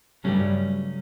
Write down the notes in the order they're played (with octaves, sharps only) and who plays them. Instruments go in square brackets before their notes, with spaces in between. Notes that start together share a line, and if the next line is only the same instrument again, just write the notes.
[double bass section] G2 G3 [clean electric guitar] C#3 F#3 A3 C#4